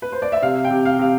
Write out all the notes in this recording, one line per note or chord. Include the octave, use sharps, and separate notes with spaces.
B4
C5
D5
E5
C3 F5
G5
C3
F5
C3 F5